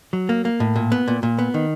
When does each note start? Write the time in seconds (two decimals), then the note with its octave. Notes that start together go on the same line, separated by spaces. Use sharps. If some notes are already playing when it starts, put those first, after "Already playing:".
0.13 F#3
0.29 A#3
0.45 A#3
0.60 A2
0.76 A#2
0.92 B3
1.08 A#2
1.23 A#2
1.39 B3
1.54 D#3